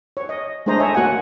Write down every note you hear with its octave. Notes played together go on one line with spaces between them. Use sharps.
C#5
D#5
G#3 A3 D4 C5 D#5 A#5
C#5 E5 G#5
A#3 F#4 F#5 G#5